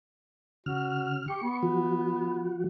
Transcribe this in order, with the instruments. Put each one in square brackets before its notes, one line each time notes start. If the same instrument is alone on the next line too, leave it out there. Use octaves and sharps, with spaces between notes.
[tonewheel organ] C#3 F6 [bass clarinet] F#4
[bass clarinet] G4 [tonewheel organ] C#6
[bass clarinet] B3
[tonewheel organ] F3 F#4